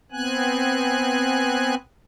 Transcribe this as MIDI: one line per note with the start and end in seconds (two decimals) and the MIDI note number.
0.12 1.75 59
0.12 1.75 60
0.12 1.75 80
0.12 1.75 90